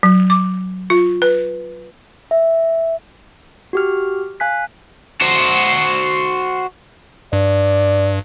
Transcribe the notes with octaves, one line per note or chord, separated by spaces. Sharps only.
F#3
D6
F4
B4
E5
F#4 G4 F6
F5 G#5 F#6 B6
F#4 C5
G2 D5